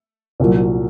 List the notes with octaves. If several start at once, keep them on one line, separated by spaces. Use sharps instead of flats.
C2 A#2 F#3